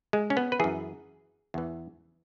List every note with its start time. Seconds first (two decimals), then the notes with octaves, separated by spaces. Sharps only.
0.13 G#3
0.30 C#4
0.37 B3
0.52 B4
0.60 F#2 E3 G#4
1.54 E2 E3